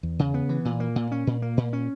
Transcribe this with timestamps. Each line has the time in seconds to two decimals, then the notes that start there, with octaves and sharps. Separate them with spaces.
0.03 E2
0.19 C#3
0.34 B3
0.49 E3
0.65 A#2
0.80 A#3
0.96 A#2
1.12 C#4
1.27 A#2
1.42 A#3
1.57 A#2
1.73 C#4